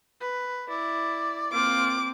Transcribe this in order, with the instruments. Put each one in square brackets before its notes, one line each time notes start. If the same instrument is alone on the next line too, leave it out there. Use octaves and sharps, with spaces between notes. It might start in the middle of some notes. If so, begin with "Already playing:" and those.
[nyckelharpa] B4
[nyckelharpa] E4 [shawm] D5
[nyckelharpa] A#3 C4 [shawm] F4 [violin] D6